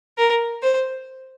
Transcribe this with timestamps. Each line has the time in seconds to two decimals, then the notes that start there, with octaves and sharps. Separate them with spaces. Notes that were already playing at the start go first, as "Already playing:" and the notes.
0.18 A#4
0.62 C5